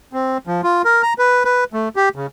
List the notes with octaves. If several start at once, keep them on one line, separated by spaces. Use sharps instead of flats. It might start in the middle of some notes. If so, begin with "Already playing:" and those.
C4
F3
F4
A#4
A#5
B4
B4
A3
G4
C#3